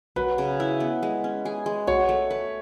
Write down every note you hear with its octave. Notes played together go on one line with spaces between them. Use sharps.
F#3 B4
C#3
E4
B3
G#3
C#4
G#4
G#3
F#4 C#5
A3
B4